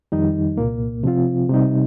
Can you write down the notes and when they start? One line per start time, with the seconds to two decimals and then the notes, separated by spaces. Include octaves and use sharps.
0.12 F2 D#3 G3 D#4
0.57 C2 A#2 A#3
1.03 C3 F3 C4 F4
1.49 C3 G3 D#4